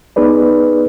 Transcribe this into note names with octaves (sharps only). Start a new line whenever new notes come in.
B3 D#4 G#4 B4 D5